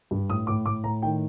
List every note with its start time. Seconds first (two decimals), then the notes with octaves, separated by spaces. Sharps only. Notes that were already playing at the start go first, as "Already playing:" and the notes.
0.11 G2
0.30 A2 D#6
0.47 A2 D6
0.66 A2 D6
0.84 A2 A#5
1.02 D#3 G5